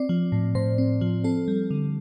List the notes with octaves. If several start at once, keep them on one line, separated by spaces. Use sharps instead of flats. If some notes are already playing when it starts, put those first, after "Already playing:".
Already playing: C4 D5
F3
A2
A2 C5
C4
F3
C4 A4
G3
D3